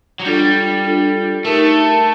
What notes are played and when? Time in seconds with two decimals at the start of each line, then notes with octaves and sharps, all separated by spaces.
0.20 F#3
0.25 G3 D4 F4 A4
0.85 D4 F4 A4
1.45 A3 D#4 G4 A#4